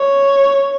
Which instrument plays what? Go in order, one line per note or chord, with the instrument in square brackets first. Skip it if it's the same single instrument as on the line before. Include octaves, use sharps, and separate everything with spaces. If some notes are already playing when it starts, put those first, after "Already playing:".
Already playing: [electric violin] C#5